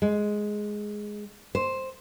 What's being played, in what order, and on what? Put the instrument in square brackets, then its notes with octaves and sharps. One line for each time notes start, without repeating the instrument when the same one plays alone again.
[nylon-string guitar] G#3
C5